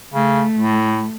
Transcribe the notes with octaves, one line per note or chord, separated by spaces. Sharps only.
C#3 A3
A2